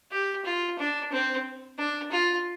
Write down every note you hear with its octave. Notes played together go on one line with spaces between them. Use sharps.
G4
F4
D4
C4
D4
F4